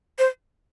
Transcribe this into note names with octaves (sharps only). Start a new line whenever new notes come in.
C5